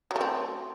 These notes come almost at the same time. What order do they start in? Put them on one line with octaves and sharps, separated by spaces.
F#3 A3 C4